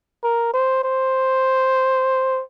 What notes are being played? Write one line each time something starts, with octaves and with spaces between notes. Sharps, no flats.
A#4
C5
C5